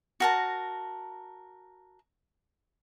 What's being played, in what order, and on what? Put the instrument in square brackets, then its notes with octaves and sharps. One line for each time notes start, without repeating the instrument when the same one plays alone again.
[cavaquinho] F#4 A#4 A5